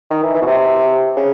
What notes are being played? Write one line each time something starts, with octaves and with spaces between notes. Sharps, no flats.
D#3
E3
E3
B2
C3
C#3